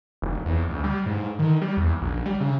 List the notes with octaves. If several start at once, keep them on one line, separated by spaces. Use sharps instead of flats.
F1
E2
D2
G3
G#2
D#3
G3
E2
A#1
G3
C#3